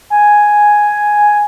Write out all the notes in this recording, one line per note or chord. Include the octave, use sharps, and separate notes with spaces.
G#5